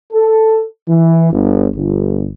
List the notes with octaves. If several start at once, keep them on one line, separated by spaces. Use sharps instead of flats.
A4
E3
G1
G1